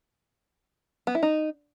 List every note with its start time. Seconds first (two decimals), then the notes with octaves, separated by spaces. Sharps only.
1.07 B3
1.15 E4
1.23 D#4